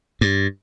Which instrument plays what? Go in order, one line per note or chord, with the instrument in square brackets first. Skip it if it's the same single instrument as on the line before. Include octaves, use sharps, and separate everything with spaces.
[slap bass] G2